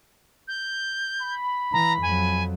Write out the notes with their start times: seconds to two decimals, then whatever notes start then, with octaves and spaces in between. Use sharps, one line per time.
0.48 G6
1.21 B5
1.73 E3 A#5
2.02 F2 F#3 G#5